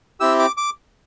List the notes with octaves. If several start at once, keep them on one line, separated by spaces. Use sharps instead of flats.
C4 E4 G4 E6
D6
D6